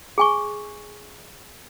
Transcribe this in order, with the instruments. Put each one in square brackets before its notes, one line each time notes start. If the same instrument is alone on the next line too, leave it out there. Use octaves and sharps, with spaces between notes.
[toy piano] G#4 G#5 C#6